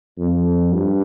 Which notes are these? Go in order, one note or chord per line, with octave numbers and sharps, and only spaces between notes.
F2
G2